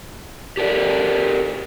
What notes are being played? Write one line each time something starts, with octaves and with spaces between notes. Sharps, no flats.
G4 A4 A#4 D5